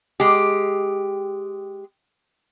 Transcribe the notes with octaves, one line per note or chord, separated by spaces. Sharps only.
G#3 G4